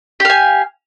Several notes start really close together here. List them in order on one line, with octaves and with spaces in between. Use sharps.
G4 F5 G#5